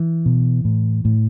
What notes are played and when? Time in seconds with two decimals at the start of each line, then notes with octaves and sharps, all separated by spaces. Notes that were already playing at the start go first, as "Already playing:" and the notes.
Already playing: E3
0.26 B2
0.65 A2
1.05 A2